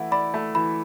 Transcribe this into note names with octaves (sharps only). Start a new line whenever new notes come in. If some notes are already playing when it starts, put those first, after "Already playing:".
Already playing: E3 A3 E4 F#5
D5 B5
A3
E3 B5